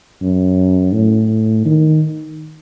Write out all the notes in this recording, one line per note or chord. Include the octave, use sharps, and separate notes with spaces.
F#2
A2
D#3